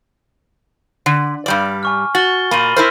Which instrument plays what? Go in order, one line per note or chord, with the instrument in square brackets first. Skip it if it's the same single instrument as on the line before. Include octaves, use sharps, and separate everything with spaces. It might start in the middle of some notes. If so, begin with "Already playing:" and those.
[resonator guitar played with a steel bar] D3
G2 G3 D5
[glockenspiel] G#5 C#6 F6
[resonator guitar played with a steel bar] F#4 [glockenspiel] A6 G7
[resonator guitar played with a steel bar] A#2 A#3 [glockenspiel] B5 D#7 F#7
[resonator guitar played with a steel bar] E4 A#4 C5 [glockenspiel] F6